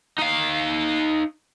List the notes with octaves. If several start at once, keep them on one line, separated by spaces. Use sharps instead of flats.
D#4 F5